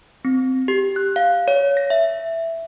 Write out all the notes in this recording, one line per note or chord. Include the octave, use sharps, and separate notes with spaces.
C4
G4
F#6
F5
C#5
A#6
E5